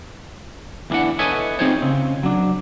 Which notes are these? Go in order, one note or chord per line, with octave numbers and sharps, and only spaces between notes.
E2 D3 E3 D4 F#5
A4 B4 C#5 D#5 E5 G#5
C4 D#4 F4 G#4 C5 C#5
C#3 C4
F#3 D4